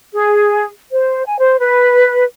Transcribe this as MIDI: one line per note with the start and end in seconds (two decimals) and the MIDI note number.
0.14 0.65 68
0.92 1.25 72
1.26 1.38 80
1.40 1.59 72
1.60 2.24 71